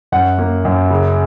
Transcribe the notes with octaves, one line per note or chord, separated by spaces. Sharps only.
F#2 F#5
A#3
F#2
C#3